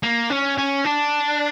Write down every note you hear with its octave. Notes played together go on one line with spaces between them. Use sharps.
A#3
C#4
C#4
D4